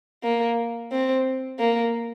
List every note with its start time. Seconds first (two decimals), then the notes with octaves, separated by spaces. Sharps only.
0.24 A#3
0.92 C4
1.59 A#3